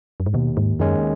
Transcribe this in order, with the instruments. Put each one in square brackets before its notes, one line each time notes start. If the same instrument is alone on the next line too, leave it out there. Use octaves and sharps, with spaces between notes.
[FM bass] F#2
G#2
[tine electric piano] D#2 [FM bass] B2
[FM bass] G#2
[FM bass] F#2 [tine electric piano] D#3 G#3 C#4